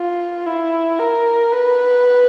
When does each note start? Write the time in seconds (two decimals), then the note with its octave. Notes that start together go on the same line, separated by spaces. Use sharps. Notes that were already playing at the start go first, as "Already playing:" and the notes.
Already playing: F4
0.46 E4
0.99 A#4
1.52 B4